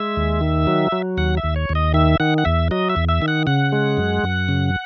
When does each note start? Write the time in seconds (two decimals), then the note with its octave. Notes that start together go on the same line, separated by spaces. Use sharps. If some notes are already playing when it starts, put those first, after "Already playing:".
Already playing: G#3 E5
0.17 D#2
0.41 D#3
0.67 F#3
0.92 F#3
1.17 D#2 F#5
1.37 E5
1.44 D#2
1.56 C#5
1.69 D#2
1.75 D#5
1.94 D#3 E5
2.20 D#3 F#5
2.38 F#5
2.45 E2 E5
2.71 F#3 D#5
2.90 E5
2.96 E2
3.09 E5
3.22 D#3
3.28 F#5
3.47 C#3 F#5
3.72 G#3
3.97 F#2
4.23 F#2
4.48 C#3